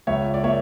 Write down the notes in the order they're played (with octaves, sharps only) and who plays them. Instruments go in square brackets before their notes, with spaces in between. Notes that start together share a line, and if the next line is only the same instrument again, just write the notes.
[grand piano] C#2 C#5 E5
D5
A#3 C#5 E5